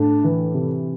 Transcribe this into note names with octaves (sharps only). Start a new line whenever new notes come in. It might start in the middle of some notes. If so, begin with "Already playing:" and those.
Already playing: A2 D4
E3
C3